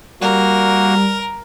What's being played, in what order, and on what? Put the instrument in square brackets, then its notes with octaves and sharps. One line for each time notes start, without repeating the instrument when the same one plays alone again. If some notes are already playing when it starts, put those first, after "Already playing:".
[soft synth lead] G3 [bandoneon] A#3 F#4 [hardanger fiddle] A#4